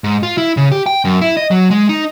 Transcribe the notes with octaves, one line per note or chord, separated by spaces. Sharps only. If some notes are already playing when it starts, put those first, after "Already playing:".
G#2
F4
E4
C#3
G4
G5
F#2
E4
D#5
F#3
G#3
D#4